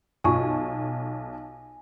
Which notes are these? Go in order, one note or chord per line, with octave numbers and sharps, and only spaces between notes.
B1 F4 G#5 A5 C#6